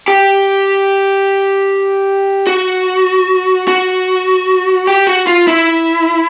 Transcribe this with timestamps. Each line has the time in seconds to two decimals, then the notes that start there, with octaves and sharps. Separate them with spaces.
0.08 G4
2.47 F#4
3.68 F#4
4.87 G4
5.07 F#4
5.27 F4
5.47 E4